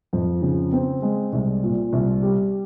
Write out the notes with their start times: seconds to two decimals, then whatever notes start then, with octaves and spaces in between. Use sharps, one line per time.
0.13 F2
0.42 C#3
0.72 C4
1.02 G#3
1.33 C2
1.63 A#2
1.93 C2
2.23 G3